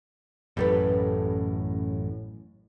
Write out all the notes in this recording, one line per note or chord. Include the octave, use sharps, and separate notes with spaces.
A1 F#2 A2 G4 A4 B4